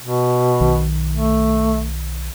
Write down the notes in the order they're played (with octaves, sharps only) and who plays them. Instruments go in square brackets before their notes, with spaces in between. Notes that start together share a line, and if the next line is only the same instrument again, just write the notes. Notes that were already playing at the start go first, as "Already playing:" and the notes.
[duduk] B2
[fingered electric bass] B1 D#3
[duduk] A3